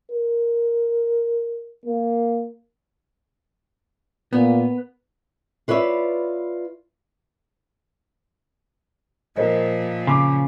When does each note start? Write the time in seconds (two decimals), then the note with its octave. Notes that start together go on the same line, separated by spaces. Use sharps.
0.11 A#4
1.86 A#3
4.33 A#2 B3
5.68 F4 B4 C#5 D5 E5
9.36 A#2 F3 A#4 C5 D#5
10.07 C#3 C6 D6